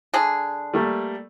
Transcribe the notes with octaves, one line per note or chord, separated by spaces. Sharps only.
D3 G#4
G3 A3 A#3